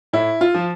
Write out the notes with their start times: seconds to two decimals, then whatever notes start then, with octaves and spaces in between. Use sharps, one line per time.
0.13 A2 E4
0.41 F4
0.54 F3